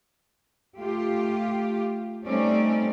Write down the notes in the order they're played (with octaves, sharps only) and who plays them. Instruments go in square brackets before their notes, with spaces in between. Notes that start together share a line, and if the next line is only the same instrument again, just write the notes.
[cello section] A3 F4 G4
G3 A3 C4 C#4 D#4 D5